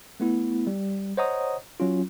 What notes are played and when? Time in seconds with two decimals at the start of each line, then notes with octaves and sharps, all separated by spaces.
0.20 A3 B3 E4
0.67 G3
1.17 C5 C#5 D#5 F#5 A#5 D#6
1.80 F#3 C#4 F4